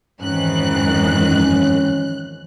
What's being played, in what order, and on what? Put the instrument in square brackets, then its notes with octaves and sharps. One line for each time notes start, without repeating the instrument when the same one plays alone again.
[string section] F2 F#6 [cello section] G#2 D#3 E3 [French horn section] C#4